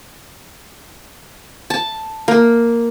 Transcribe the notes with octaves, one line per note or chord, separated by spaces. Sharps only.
A5
A#3